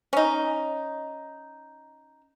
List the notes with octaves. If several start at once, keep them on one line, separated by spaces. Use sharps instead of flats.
C#4 D#4